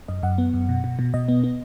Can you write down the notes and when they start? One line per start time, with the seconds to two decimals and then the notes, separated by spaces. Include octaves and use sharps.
0.08 F#2 D#5
0.23 F#2 F#5
0.38 B3
0.54 F#2
0.69 B2
0.84 B2
0.99 B2
1.14 B2 D#5
1.28 B3
1.44 B3